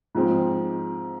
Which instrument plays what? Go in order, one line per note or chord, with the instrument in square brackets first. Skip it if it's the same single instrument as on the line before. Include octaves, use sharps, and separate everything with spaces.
[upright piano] G#2 F3 G#3 C4